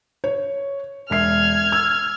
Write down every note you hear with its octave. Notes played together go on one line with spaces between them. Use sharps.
C#5
E1 E5 F6 G#6 C7
E6